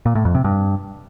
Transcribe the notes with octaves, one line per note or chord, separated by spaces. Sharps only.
A#2
A2
F2
C3
G2